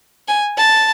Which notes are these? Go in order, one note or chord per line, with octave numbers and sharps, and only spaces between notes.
G#5
A5